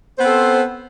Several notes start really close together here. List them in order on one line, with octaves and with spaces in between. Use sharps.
C5 B3 C4 A4